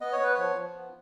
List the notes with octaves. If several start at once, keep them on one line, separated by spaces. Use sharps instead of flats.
B3 D#5
C#5
B3 B4
F3 C#5
F3
B3